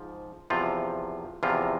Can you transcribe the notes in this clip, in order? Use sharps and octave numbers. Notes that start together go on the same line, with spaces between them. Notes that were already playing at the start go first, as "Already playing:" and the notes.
Already playing: G#2 F3
E2 C3 F3 F4
E2 C3 F3 F4